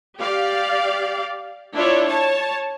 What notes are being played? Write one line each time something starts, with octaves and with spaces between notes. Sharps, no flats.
G4 D5 F5
D4 E4 F4 C#5 D5
C#5 A5